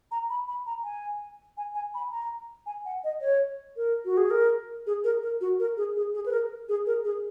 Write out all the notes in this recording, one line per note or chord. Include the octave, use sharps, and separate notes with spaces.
A#5
B5
B5
A#5
G#5
G#5
G#5
B5
A#5
G#5
F#5
D#5
C#5
A#4
F#4
G#4
A#4
G#4
A#4
A#4
F#4
A#4
G#4
G#4
G#4
B4
A#4
G#4
A#4
G#4